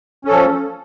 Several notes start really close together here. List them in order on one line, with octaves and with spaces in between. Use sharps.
C#4 A4 F3